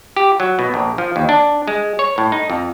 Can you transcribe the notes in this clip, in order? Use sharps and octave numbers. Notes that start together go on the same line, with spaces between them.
G4
F#3
B2
A#1
F3
D#2
D4
G#3
C#5
A2
D#4
F2